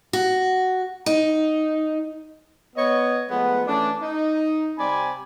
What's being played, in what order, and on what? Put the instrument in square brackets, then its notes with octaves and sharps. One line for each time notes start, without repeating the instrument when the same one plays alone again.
[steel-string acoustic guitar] F#4
D#4
[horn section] B3 C#5 D#5
F3 G#3 A3 B3
E3 A3 C#4 D4
D#4
C3 G3 C4 D5 G#5 B5